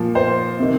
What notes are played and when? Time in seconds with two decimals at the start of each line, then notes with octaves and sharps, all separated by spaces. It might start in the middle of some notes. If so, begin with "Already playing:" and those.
Already playing: A#2 F3
0.15 C5
0.59 C3 D#3